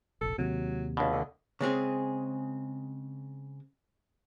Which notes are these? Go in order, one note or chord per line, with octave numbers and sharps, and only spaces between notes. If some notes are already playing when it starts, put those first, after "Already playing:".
F1 A#1 A4
D#2 C3 F#3
C#2 B2 D4
D3
C#3 G#3 C4 G#4